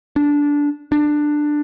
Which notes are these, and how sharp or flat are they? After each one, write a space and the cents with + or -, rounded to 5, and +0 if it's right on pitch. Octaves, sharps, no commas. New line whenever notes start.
D4 -15
D4 +15